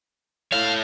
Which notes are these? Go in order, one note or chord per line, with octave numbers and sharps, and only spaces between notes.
E4 A4 C#5 F5